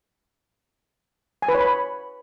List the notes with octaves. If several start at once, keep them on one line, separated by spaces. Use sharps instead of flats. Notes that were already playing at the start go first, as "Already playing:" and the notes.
G#5
B4
C#5
B5